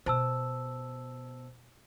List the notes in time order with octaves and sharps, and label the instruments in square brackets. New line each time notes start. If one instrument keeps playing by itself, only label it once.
[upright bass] B2 [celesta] C5 A5 E6